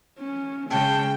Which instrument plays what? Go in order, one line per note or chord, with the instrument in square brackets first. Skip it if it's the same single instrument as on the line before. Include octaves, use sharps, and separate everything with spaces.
[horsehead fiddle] C#4
[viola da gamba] C#3 [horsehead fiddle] G#3 [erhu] G5 [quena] A5